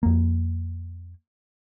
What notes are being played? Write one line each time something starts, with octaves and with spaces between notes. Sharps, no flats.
F2 A#3